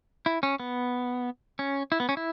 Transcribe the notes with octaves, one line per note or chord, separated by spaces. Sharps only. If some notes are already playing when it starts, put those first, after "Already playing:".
E4
C#4
B3
C#4
E4
B3
C#4
E4